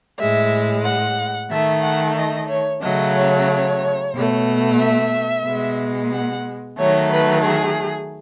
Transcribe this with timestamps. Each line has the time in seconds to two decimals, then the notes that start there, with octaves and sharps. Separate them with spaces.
0.18 A2 G#3 E5
0.84 F#5
1.49 D#3 A3 E5
1.83 F#5
2.16 D#5
2.48 C#5
2.82 C#3 F#3 A3 D#5
3.15 C#5
4.14 B2 A3
4.79 E5
5.45 B2 G#3
6.12 F#5
6.77 D#3 F#3 A3 C#5
7.10 B4
7.43 G#4